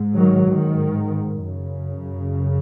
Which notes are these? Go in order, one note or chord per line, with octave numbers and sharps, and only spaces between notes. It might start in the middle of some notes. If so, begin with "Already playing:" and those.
Already playing: G#2
D#3 F#3
D#3
F#2 C#3